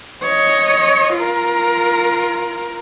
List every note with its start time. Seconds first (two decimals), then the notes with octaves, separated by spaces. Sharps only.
0.23 C#5 D#5
1.15 F4 A#4